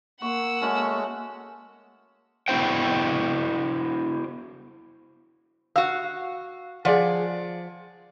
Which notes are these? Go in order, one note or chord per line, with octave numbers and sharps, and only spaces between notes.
A#3 F#5 C6 C#6 E6
G#3 A3 C#4 F#4
B3 E4 F#4 C5 G5
F#4 F5 E6
F3 G#4 D5 F#5